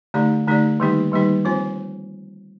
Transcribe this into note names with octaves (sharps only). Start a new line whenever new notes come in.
D3 A3 D#4 G4 D5
D3 A3 D#4 G4 D5
D#3 G3 A#3 D#4 G4
D#3 G3 A#3 D#4 G4
F3 C4 F4 C5